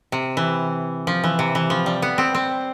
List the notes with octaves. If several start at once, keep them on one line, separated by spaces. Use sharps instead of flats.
C3
E3
F3
E3
C3
E3
F3
G3
B3
C4
C4